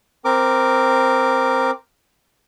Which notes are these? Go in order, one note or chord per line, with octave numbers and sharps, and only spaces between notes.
C4 A#4 D6